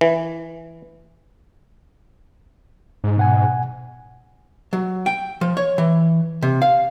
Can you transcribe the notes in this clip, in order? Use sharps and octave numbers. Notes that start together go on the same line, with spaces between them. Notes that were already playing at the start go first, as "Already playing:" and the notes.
E3
G#2
B2 F#5 G#5
F#3
G5
F3
C#5
E3
C3
F5